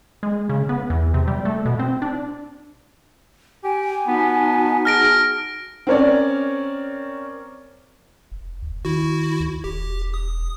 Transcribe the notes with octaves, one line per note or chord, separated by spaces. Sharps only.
G#3
C#3
B3
E2
C3
G3
A3
B2
C4
D4
G4 G#5
B3 D#4 F#4 A5
G#4 F6 A#6 D7
C4 C#4 A#4 C#5 D5
F1
D2
D#3 E4 F#4
D2
E1 G4
D#6